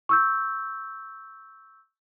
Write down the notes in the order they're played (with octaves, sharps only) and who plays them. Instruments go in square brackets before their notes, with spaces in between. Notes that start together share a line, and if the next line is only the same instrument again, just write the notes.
[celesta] C#6 E6 G6